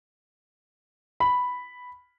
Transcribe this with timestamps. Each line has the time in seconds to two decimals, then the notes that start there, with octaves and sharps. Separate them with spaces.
1.20 B5